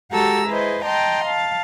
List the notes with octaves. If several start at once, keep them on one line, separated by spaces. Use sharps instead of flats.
G#3 F#4 G4 A4 A#5 E6
E4 G#4 B4 C5 D#5
D#5 G5 A5 A#5 C6
F5 A5